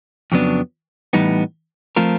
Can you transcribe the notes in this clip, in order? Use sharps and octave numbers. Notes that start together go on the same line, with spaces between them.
F2 C#3 F#3 B3 D4
A2 E3 G3 B3 D#4
F3 A3 C4 F4 A#4